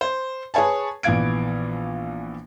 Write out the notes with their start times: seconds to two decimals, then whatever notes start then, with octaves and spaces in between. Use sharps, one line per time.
0.01 C5
0.54 G#4 B4 C#5 G#5 A5
1.03 A#1 E3 B3 F5 G#6 D7